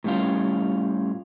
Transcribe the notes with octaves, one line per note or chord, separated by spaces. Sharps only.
A2 G3 C#4 F4